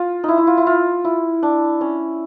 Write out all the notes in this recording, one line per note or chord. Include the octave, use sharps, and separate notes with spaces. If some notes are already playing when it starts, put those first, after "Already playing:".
Already playing: F4
D#4 E4
E4
F4
E4
F4
E4
D4
C#4